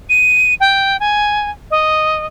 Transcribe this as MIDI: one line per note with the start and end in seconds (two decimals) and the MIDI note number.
0.10 0.54 99
0.60 1.00 79
1.00 1.50 80
1.71 2.26 75